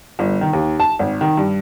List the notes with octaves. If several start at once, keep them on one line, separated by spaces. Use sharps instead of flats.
G1
D#3
D#2
A5
G#1
D#3
G2